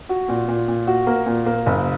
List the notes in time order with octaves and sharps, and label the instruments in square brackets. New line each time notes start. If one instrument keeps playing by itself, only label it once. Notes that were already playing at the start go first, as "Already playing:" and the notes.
[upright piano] F#4
A#2
A#2
A#2
F#4
A#3
A#2
A#3
F#1